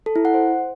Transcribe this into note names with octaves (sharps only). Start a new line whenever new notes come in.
A4
E4
F#5
C5